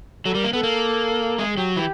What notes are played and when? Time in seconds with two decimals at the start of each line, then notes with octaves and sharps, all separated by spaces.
0.25 F#3 A4
0.35 G3 A#4
0.44 A#3
0.53 B3 A4
0.63 A#3
1.38 G#3 G#4
1.57 F#3 G4
1.76 E3 G4